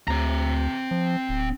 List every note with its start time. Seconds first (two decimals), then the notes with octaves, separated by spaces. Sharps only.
0.08 D2 C4 A#5
0.91 F3
1.29 D1